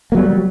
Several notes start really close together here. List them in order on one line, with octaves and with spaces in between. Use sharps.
A#3 F#3 G3